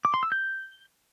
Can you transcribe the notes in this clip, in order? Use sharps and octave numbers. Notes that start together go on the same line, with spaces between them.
D6
C6
E6
G6